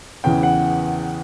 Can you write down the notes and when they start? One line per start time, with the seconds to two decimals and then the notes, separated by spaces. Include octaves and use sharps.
0.24 E2 C#3 E3 G5
0.43 F#5